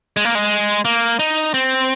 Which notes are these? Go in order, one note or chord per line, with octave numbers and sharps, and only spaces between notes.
G#3
A#3
G#3
A#3
D#4
C4